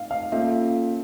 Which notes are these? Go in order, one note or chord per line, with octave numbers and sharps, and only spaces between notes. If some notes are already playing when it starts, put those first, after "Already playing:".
Already playing: F5
F5
A#3 C#4 F4 A4 E5